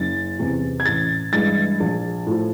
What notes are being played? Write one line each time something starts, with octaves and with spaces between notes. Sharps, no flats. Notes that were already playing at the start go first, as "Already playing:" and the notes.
Already playing: F#1 A6
E2 C3
G#6
A1 A6
G2 E3 G#3 A6
A#1
A2 F3